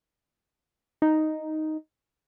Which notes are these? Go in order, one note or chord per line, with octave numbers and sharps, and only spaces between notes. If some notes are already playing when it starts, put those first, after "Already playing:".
D#4